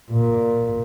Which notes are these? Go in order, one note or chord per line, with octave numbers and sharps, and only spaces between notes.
A#2